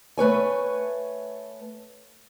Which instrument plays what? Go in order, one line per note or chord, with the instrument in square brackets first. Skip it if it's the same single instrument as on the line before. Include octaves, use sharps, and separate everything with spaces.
[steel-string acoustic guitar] A3 B4 C#5 G#5